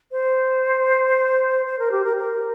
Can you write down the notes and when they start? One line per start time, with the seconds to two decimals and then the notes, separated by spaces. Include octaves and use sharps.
0.11 C5
1.65 C5
1.79 A#4
1.91 G4
2.04 A#4
2.16 A#4